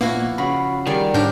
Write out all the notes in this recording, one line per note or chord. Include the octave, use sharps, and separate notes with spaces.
A#2 F3 A#3 B3 E4 F#4
C#3 F#4 B5
D#3 G3 G#4 D5
G#2 C#4 D4 G4 A#4 G6